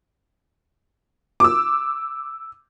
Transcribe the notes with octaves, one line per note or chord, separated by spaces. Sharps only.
D6 E6